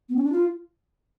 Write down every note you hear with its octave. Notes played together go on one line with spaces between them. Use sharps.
B3
C#4
D4
F4